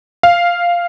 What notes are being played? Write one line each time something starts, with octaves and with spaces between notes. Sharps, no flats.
F5